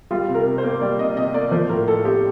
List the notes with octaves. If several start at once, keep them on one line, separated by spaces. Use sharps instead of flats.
G3 F4
C3
A#4
C3
C5
A#3
G3 D5
C3 D#5
C3 D#5
A#3 D5
F3 C5
A2 A#4
A2 A4
C4 G4